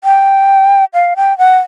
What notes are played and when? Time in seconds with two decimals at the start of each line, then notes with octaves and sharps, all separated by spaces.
0.04 G5
0.94 F5
1.16 G5
1.38 F#5